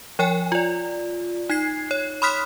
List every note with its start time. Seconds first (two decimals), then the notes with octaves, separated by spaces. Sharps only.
0.19 F3 C#5 G5 G#5
0.52 F4 D5
1.49 D#4 G#6 C7
1.91 C#5
2.22 B5 C6 D#6 F6 F#6 B6